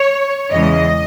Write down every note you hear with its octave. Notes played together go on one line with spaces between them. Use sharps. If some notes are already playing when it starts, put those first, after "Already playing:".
Already playing: C#5
E2 C#3 E3 G#3 D#5